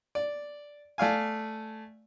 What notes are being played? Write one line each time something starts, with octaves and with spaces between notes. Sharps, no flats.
D5
A3 D5 F5 G#5